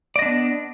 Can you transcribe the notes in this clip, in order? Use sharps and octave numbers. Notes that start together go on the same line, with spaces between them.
B3 D4 D5 D#5